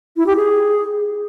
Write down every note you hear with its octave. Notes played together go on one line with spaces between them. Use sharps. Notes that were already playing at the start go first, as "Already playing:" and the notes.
E4
G4
G#4